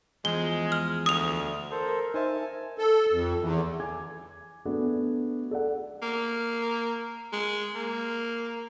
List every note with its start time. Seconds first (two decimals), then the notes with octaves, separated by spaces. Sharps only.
0.25 E2 F3 G#3 G7
0.72 F6
1.06 D2 D#6 F7
1.71 A4 A#4 C5
2.14 D#4 C5 E5 G#5 A5
2.78 A4
3.12 F2
3.40 E2
3.80 G#5 D6 G#6
4.65 A3 B3 D4 F#4
5.51 A4 D5 F#5
6.02 A#3
7.33 G#3
7.75 A#3